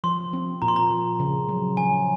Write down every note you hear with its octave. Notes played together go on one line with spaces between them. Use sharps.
F3 C6
C4
A#2 A#5
C6
A#5
F3
C#3
F#3
F3 G#5